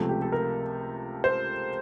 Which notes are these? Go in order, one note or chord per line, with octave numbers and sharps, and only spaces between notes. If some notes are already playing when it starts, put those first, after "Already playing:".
Already playing: C#2 C3 F3 A3
G4
A4
A#4
C5